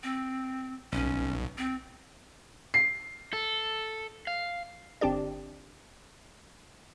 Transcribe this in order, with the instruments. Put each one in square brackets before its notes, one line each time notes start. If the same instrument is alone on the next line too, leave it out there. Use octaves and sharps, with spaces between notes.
[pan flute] C4
[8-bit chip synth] B1 [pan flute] C#4
[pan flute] C4
[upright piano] C7
[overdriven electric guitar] A4
F5
[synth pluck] G1 C4 D4 G4 D5